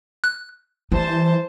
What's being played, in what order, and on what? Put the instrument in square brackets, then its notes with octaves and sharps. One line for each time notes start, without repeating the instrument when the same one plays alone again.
[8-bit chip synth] F#6
[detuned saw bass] E3 [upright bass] G3 [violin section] C5 A5